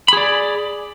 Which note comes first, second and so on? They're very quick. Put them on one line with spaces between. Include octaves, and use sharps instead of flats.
B5 G#4 D5